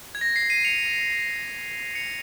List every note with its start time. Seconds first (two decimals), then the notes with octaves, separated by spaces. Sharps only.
0.15 G#6
0.21 A#6
0.36 C7
0.50 C7 D#7
0.64 C#7 F7
1.95 C#7 F7